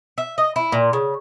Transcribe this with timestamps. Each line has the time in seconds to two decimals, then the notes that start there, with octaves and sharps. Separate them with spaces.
0.18 E5
0.38 D#5
0.56 E4
0.72 A#2
0.93 C#3